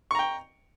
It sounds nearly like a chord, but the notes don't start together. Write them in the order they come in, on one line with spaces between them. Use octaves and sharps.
C#6 A#5 G5